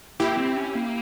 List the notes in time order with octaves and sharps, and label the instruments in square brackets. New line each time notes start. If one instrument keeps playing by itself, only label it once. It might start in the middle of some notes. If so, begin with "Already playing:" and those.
[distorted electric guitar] A#3 [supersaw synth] E4 G4
[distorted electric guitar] C4
C#4
A#3